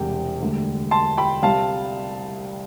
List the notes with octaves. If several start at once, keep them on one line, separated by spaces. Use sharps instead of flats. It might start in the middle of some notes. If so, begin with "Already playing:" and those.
Already playing: E1 E2 C3 G3 G5
E1 D2 D3 G3
A5 C6
G5 B5
C2 C3 G3 F5 A5